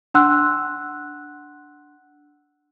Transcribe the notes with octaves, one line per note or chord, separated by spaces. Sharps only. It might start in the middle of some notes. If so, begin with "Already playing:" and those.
D4 F#5 C6 E6 F#6